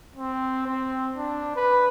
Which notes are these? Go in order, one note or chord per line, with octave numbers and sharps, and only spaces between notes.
C4
C4
D4
B4